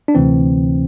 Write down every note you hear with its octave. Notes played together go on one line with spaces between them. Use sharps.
D4
D2 C3 E3 C4